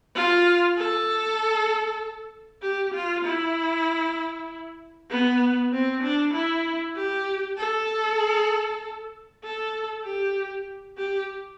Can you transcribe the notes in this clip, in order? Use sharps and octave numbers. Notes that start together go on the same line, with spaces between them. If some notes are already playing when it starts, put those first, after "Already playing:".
F4
A4
G4
F4
E4
B3
C4
D4
E4
G4
A4
A4
G4
G4